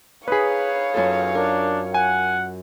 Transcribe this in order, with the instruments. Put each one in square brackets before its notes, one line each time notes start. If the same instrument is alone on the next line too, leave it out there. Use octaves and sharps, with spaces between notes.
[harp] D#4 B5 [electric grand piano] G#4 B4 [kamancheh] C#5 F5
[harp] F#2 F4 A4
[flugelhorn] D4 [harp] A#4
[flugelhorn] F#5 [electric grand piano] G#5